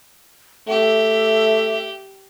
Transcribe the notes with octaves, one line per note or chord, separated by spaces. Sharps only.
A3 G4 E5